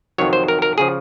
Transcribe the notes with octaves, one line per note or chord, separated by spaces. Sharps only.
F2 C3 D#3 F#3 C#5
C5
A#4
A#4
C#3 F3 G#4